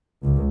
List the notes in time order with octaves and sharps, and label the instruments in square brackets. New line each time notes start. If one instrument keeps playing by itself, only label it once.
[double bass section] C#2